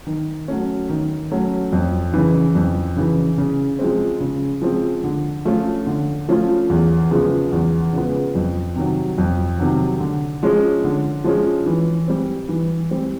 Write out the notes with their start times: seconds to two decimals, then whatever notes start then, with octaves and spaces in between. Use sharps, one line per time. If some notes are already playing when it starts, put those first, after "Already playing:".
0.07 D#3
0.48 F#3 A3 C#4
0.90 D#3
1.31 F#3 A3 C#4
1.73 F2
2.14 C#3 E3
2.55 F2
2.97 C#3 E3
3.38 C#3
3.79 F3 G#3 C4
4.20 C#3
4.62 F3 G#3 C4
5.04 D3
5.45 F3 A3 C#4 F4
5.87 D3
6.29 F3 A3 C#4 F4
6.69 E2
7.11 C#3 F3 G#3 B3
7.52 E2
7.93 C#3 F3 G#3 B3
8.35 F2
8.76 C3 D#3 F#3
9.18 F2
9.59 C3 D#3 F#3
10.00 D3
10.43 F3 G#3 C#4
10.84 D3
11.24 F3 G#3 C#4
11.66 E3
12.08 G3 C4
12.49 E3
12.91 G3 C4